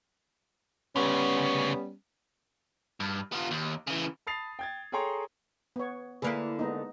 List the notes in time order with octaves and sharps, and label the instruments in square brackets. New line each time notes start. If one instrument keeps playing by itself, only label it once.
[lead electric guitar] D2 C#3 [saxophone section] G3 B3 C#4
[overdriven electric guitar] G2
B3 F4
D#2
C#3 E3
[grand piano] A5 B5 D#6 A6 C7 F7
G5 G#6 A6
G#4 A4 C#5 G5 A#5 C6
[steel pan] B3 C#5
[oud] D3 A#3 E4 [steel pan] G#4 B4
[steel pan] G#3 B3 D#4